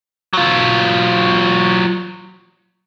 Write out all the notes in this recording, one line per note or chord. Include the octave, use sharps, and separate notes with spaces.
F#3 F4